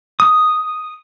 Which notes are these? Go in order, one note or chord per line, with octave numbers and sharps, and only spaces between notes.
D#6